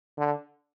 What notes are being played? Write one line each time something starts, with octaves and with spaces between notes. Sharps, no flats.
D3